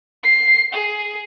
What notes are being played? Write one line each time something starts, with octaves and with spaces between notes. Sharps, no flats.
C7
G#4